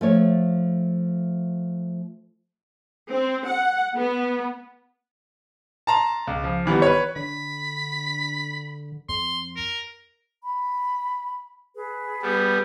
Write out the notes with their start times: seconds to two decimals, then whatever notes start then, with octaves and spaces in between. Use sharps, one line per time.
0.01 F3 A3 C#5
3.10 C4
3.46 F#5
3.96 B3
5.87 A5 A#5 C6
6.27 C#2
6.44 F3
6.66 D#3 E3 G3 B3
6.82 B4 C#5
7.16 D3 B5
9.09 F2 C6
9.56 A#4
10.42 B5
11.75 G#4 B4
12.22 G3 B3